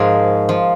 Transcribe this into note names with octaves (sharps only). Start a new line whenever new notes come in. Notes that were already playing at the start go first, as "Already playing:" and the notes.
Already playing: G#2 F3 G#4 A#4
F3